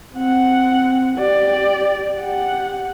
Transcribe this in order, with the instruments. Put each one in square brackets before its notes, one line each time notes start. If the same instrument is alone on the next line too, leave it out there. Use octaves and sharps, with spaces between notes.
[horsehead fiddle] C4 F#5
G4 D5
G4 F#5